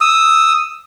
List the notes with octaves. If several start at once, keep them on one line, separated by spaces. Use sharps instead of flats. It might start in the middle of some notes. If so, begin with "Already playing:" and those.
D#6 E6